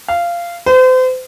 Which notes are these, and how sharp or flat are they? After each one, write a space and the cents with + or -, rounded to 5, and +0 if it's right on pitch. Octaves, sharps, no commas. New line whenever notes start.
F5 -15
C5 -35